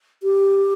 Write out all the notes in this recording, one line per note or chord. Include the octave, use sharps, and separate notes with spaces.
G4